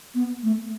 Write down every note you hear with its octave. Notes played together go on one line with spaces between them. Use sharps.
B3
A3